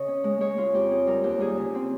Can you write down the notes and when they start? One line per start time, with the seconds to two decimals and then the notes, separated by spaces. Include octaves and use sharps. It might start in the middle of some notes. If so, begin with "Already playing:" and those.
Already playing: C#3 C#5 D#5
0.08 C#4
0.24 G#3
0.40 G#3 C#5
0.58 G#3 F4
0.74 F2 G4
0.91 C4 G#4
1.07 G3 A#4
1.24 D#2 G4
1.40 G3 G#4
1.57 C#3
1.75 C4